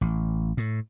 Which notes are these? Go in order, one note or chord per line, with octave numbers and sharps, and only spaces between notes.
A1
A2